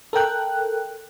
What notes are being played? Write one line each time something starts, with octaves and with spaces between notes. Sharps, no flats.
A4 A#4 G5 F#6